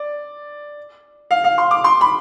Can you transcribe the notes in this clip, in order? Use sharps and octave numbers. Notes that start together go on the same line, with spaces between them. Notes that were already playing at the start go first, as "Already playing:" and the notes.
Already playing: D5
F5
F5
C6
D6
C6
B5